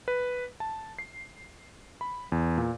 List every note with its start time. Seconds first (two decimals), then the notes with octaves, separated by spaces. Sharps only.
0.08 B4
0.60 A5
0.99 C7
2.01 B5
2.32 E2
2.58 A#2